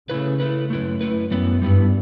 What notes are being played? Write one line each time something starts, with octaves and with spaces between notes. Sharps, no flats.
C#3 A3 E4 B4
A3 E4 B4
F#2 A3 E4 B4
A3 E4 B4
F#2 G3 B3 E4
G2 G3 B3 E4